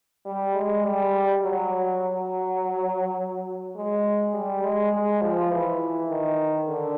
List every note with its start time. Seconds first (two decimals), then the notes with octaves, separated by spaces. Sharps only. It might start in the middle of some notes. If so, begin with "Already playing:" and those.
0.25 G3
0.55 G#3
0.84 G3
1.42 F#3
2.01 F#3
3.76 G#3
4.34 G3
4.63 G#3
4.93 G#3
5.21 F3
5.51 E3
6.09 D#3
6.68 D3